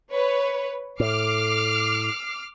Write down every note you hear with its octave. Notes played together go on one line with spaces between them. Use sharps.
B4 C#5
A2 D6 F6 C7